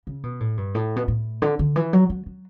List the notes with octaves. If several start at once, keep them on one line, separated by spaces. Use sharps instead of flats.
C#3
B2
A2
G2
A2
B2
A2
D3
D3
E3
F#3
F#3
F#3